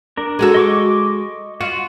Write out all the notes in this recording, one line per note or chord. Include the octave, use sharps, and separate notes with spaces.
D4 A#4
G#3 F#4 A4
D#5 C#6 D6
F4 F#4